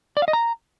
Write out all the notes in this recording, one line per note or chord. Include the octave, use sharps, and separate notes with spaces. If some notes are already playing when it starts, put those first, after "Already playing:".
D5
F5
D#5
A#5